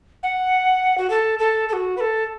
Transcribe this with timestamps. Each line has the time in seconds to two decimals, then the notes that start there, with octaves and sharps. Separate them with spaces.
0.23 F#5
0.97 F#4
1.10 A4
1.39 A4
1.68 A4
1.73 F#4
1.97 B4
2.00 A4